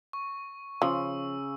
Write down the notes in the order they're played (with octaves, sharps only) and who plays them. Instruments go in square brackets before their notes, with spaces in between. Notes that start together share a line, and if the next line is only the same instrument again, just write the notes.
[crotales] C#6
[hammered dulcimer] C#3 [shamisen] F3 [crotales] E6